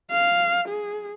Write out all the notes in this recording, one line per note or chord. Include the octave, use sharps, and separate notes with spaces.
F5
G#4